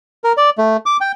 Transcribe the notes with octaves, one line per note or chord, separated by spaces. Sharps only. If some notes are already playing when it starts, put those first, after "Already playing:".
A#4
D5
A3
D6
G5